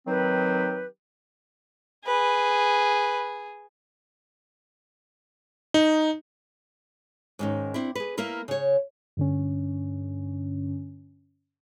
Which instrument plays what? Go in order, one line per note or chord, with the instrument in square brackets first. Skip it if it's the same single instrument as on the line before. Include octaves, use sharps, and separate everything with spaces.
[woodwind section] D#3 F#3 C4 D#4 G4 B4
[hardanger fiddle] G#4 [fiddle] B4
[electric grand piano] D#4
[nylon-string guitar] G#2 D#3 C#4
C4 D4 E4
G#4 B4
A#3 E4 A#4 B4
C#3 C#5
[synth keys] G2 D3 C#4